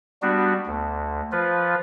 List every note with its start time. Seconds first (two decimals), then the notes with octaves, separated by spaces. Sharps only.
0.22 G3 B3 D4 F#4
0.66 D2
1.32 F3 F4 B4